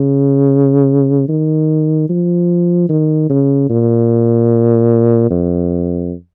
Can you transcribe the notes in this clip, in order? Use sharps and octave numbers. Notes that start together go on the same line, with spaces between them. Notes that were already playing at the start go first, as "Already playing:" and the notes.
Already playing: C#3
D#3
F3
D#3
C#3
A#2
F2